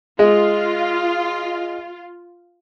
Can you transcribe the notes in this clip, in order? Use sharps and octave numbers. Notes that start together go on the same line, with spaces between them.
G#3 F4